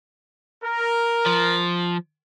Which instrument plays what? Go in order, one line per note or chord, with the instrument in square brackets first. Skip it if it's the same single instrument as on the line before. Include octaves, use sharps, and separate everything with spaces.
[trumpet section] A#4
[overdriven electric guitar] F3